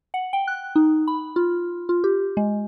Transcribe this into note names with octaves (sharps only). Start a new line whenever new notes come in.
F#5
G5
F#6
D#4
B5
F4
F4
G4
G#3